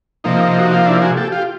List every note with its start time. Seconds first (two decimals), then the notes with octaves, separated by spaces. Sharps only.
0.24 C3 F3 A#3 D#4
0.59 F#4
0.72 F4
0.86 D4 E4
1.02 F#4 G#4
1.17 G4 A4
1.32 F4 G4